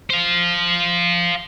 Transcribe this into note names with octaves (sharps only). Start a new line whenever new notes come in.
C5 F5